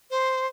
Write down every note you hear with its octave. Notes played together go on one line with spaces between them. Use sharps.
C5